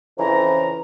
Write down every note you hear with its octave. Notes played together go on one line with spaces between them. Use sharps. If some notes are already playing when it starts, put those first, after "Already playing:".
F2 C#3 E3 F3 A#5